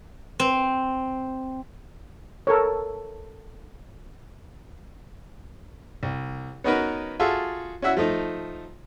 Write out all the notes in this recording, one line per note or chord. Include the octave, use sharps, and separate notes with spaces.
C4
A4 A#4 C#5
C2
B3 C#4 D#4 F#4 A#4 B4
F4 F#4 G#4 A4 E5
C#4 E4 F#4 E5 F#5
F3 A3 D#4